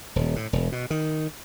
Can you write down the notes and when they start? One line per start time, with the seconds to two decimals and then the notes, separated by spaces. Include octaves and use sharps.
0.16 D#1
0.36 A2
0.53 E1
0.72 B2
0.90 D#3